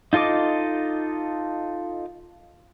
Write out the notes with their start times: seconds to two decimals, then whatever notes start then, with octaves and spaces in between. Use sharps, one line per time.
0.13 D#4 F4 A4 D#5 D6